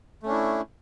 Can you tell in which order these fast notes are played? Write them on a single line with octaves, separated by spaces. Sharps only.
A3 C#4 D4 E4